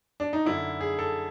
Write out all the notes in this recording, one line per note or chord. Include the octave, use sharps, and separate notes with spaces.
D4
D#4
F#2 D3 E4
G#4
A4